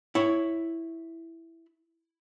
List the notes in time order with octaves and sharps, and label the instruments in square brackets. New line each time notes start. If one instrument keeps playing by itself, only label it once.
[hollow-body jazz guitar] E4 C#5